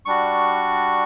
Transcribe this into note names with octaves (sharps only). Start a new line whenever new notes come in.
G3 D4 F#4 C#6